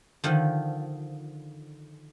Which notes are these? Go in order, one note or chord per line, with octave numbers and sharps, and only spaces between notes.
D3 D#3 F3